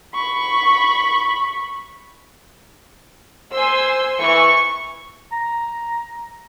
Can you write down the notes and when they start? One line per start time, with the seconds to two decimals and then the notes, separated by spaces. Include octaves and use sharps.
0.15 B5 C#6
3.53 C5 G#5 C6 E6
4.20 E3 C#6
5.32 A#5